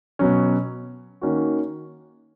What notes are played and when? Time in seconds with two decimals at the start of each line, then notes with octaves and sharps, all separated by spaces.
0.19 B2 F#3 C#4
1.21 D#3 A#3 C#4 F#4